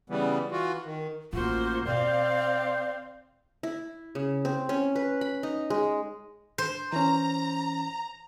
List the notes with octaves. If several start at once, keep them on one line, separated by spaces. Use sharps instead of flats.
C#3 E3 G3 B3
E3 F4 F#4
D#3
A1 A#3 C#4 F4 F#4 C5
B2 C4 C5 D5 F5
E4
C#3
C4
C#4
B4
B5
D#4
G#3
C5
E3 C#4 A#5